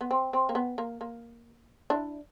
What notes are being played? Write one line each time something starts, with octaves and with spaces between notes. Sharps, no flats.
B3
C4
C4
A#3
B3
A#3
A#3
D4 E4